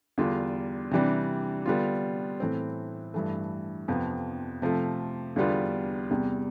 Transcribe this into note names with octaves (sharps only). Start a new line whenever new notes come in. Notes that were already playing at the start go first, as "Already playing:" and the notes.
E2 D3 G3 D4 F4
C3 E3 G3 D4
D3 G3 B3 D4 F4
A2 E3 A3 C4
G2 E3 A3
F2 C3 F3 B3
C3 F3 A3
E2 D3 G3 B3 F4
E2 C3 G3